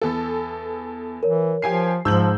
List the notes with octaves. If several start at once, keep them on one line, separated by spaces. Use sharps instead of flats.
E2 A4
E3 A#4 C#5
F3 G4 G#5 C7
G#2 F3 A5 E6 G6 F#7